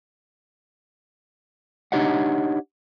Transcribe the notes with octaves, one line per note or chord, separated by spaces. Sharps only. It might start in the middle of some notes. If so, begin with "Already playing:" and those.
D4 D#4 G4 C#5 D#5 F#5